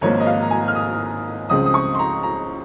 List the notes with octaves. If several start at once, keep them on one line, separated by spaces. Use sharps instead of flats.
G#1 G#2 F3 A#3 C#5
D#5
F5
A#5
G#5
F6
D#6
C#2 C#3 F3 G#3 C4 D#6
D#6
C#6
C6
A#5
A#5